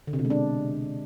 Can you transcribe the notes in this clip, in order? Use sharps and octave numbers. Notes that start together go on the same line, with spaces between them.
D3
C3
B2
G#3
D4